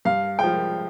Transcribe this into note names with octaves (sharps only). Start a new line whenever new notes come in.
G2 F5
F3 G#3 G5